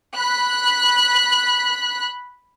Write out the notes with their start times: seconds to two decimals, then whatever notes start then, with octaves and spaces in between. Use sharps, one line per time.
0.16 B5 F#6 B6